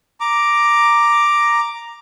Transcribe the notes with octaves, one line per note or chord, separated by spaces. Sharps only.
A#5 D6